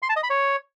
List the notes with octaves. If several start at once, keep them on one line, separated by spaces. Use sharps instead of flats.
C6
A5
D#5
B5
C#5